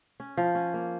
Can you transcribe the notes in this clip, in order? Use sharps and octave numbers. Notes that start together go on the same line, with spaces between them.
C#4
F3
C#4
A#3